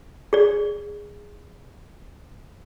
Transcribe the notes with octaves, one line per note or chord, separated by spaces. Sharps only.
G#4 D5